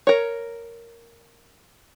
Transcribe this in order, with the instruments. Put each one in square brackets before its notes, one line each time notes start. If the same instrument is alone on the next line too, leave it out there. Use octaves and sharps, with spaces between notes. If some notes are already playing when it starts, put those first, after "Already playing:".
[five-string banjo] A#4 C#5